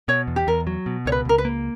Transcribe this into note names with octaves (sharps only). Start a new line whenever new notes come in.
B2 C#5
E2
G4
E2 A#4
F#3
B2
C#2 C#5
B4
C#2 A#4
B4
A#3